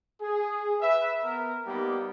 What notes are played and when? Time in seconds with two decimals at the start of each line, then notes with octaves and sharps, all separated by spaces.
0.20 G#4
0.81 B4 E5
1.23 B3 A#4
1.66 G3 A#3 B3 D#4 G4